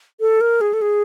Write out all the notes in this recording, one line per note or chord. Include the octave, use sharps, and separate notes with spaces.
A4
A#4
G#4
A4
G#4